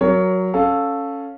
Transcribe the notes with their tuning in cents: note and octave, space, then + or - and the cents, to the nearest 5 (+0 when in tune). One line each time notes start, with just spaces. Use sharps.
F#3 +0 A#4 +0 C#5 +20
C#4 +0 A4 +0 F5 +10